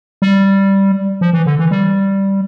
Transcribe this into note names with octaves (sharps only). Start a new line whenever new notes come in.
G3
F3
E3
D3
E3
G3